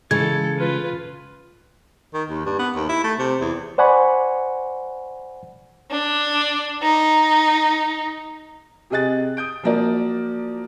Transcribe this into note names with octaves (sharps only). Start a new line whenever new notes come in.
C#3 E3 G#3 A4 G#6
F4 B4
D#3
D#2
G2
B3
D#2
E4
A3
C3
E2
C5 D5 F#5 G#5 B5 C#6
D4
D#4
C3 G4 G#4 D#5 F#6 A6
D#6 G6 D7
F3 F#3 A#3 A#4 D5